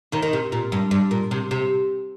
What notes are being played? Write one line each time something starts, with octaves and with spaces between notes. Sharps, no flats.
D#2 D#3
D#3
C3
A#2
G2
G2
A#2
C3
C3